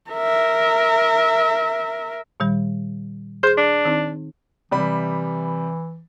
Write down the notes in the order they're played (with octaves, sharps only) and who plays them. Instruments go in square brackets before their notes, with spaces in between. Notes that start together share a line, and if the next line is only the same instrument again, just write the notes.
[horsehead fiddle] A#4 E5
[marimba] A#2 D#3 G3
[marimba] G#4 C6 [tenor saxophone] C5
[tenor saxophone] D4
[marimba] D#3 C4 D#4
[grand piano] C3 G3 B5 [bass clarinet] E3